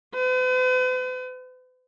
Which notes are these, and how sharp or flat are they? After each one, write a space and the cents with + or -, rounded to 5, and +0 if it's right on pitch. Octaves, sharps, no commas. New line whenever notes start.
B4 +45